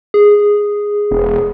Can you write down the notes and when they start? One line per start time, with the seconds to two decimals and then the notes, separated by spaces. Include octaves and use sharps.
0.14 G#4
1.11 E1